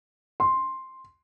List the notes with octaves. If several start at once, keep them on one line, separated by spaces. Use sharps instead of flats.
C6